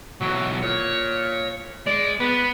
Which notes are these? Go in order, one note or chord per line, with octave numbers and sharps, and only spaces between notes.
B1 E3 F#3
A#2 C#5
G#3 D5
B3 B4